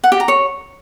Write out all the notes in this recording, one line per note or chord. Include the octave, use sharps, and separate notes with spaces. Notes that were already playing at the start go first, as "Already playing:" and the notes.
F#5
G4
A#5
C#5